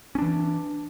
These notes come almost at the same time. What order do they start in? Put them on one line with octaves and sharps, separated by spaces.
C#4 D4 E3